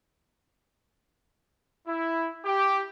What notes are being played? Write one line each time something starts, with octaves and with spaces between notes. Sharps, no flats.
E4
G4